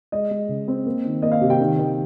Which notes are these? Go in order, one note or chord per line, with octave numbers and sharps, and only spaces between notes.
G#3 D#5
G#3
C#3
C4
A#3
D#3
A#3 D#5
F5
C3
G5
D#3
D#3